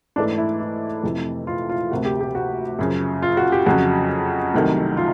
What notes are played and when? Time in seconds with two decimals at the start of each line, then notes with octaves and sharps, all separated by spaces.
0.16 G#2 E3 A3 D4
0.38 E4
0.60 E4
1.03 F2 C3 E3 A3
1.47 F4
1.70 F4
1.91 D2 C3 F3 A#3 F#4
2.05 G4
2.21 G4
2.35 F#4
2.79 F#2 C#3 F3
3.22 F4
3.37 F#4
3.52 G4
3.66 F2 C#3 F#3 F#4
4.54 C2 C3 D#3 F#3 A3
4.97 F4